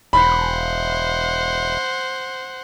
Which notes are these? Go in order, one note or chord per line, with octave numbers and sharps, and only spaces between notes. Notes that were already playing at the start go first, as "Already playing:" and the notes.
E1 C5 F#5 B5